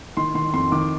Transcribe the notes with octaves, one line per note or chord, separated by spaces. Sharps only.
D#3 C6
D#3 C6
F2 C6
D#3 D6